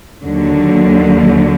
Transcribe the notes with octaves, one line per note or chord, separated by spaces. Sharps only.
D#2 D3 F#3